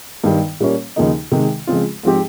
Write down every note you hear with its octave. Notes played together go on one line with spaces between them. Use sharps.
G2 D#3 G3
A#2 G3 A#3 C#4
D#2 C#3 F3 A#3 D#4
C3 D#3 G#3
C#3 F3 G#3 C4 F4
G#2 F3 C4 G4